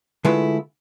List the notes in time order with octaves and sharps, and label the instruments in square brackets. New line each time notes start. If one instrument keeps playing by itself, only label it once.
[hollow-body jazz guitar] D3 G#3 A3 E4 F4 B4